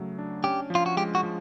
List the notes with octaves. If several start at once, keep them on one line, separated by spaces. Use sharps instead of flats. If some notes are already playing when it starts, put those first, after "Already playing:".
Already playing: C#3 F#3 A3
D4
C#4 G4
F3
F4
F#4
G#3 G4
F#4
F3